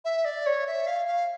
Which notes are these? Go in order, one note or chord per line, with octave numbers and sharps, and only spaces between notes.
E5
D5
C#5
E5
F5
F5